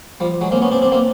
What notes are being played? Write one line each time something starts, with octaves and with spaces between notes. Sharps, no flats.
F3 G3
F#3 G#3
A#3 C4
B3 C#4
C4 D4
C4 D4
A#3 C4